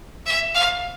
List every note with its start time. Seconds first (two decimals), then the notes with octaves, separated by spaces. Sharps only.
0.26 E5
0.54 F5